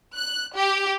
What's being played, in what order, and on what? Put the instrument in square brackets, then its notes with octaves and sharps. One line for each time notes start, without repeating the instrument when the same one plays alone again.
[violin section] F#6
G4